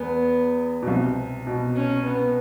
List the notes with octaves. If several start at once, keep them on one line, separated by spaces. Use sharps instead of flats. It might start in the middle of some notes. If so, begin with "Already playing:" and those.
Already playing: E2 B3
B2
C2 C3
B2
C#4
B3